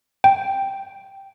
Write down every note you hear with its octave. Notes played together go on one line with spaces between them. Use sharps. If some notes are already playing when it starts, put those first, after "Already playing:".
G5